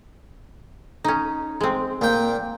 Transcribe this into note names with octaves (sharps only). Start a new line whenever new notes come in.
C#4 D#4
G#3 C4
A#2 G5